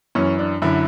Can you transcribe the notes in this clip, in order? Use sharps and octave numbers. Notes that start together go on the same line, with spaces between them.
F#2 E3 C#4
D4
F#2 D3 E4